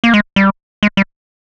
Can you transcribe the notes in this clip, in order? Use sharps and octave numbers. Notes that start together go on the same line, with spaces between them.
A#3
G#3
G3
G#3
G3